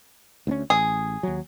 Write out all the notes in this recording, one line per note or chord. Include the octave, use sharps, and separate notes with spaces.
D2 B3 C#4
A1 G#4
D#2 F#3